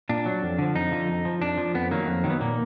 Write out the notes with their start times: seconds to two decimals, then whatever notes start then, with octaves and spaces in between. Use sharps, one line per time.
0.09 A#2 D4
0.26 F#3
0.42 F2
0.59 D3 F3
0.75 F2 D#4
0.92 D3 F3
1.08 F2
1.25 F3
1.41 F2 D4
1.58 F3
1.74 F2 B3
1.91 D#3 F#3 A#3
2.07 F2
2.24 D#3 F#3
2.30 B3
2.40 A#2 A#3